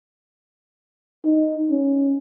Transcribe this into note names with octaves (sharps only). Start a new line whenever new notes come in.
D#4
C#4